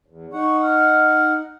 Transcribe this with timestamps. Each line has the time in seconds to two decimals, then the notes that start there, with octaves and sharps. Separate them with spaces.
0.06 E2
0.33 D#4 F#5 C#6
0.63 F6